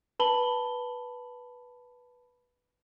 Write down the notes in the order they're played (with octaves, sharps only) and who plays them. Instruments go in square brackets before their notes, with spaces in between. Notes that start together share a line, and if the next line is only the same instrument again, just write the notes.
[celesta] B4 A5 B5 F#7 G7